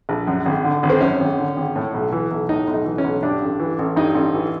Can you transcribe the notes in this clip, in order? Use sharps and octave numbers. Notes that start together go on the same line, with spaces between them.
A#1
F#2
G#1
D3
G#1
C4
F#2 C#4
G#1
D3
G#1
A2
B1
E3
B1
A2 D#4
B1
D#4
E3
C#4
B1
G2 D4
A1
E3
A1
G2 D#4
A1
E3